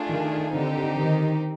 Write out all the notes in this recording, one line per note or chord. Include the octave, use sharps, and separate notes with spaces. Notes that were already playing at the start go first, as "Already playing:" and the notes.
Already playing: A3 D4 F4 G#4
D#3
D3 C4 D#4 G4
D#3